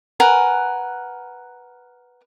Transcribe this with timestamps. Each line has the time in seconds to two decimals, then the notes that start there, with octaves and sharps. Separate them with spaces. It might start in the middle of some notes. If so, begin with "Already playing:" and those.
0.20 A#4 B4 F#5 G#5